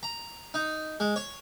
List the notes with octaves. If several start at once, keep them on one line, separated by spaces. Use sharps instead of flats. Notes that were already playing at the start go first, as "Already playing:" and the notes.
A#5
D#4
G#3
C#5